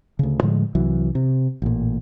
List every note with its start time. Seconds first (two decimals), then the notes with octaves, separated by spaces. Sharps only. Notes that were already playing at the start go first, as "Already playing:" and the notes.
0.19 D2 C#3
0.42 A2 D3 F3 G#3
0.75 C2 E3 F#3
1.15 C3
1.62 A1 A#2